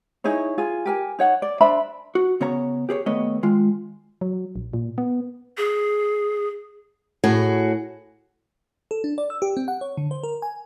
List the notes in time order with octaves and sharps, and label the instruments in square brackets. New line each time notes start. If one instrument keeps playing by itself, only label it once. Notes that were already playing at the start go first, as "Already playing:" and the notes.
[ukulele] D#4 E4 G#4 C#5
F4 G#4 G#5
G4 A#4 G#5
D#4 C#5 F#5
D5
D4 C5 E5 B5
[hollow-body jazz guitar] F#4
C#3 B3 C#4 C#5 F#5 A#5
G4 G#4 B4 C#5
D#2 A3 B3 C#5 D#5
D#3 G#3 F4
[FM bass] F#3
A#1
A#2
B3
[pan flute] G#4
[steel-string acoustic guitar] A2 F#4 G#4
[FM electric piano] A4
D4
D5
E6
G4
C4
F#5
C#5
D3
C5
A#4
G#5